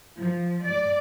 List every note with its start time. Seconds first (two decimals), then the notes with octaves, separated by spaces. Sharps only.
0.19 F3
0.65 D5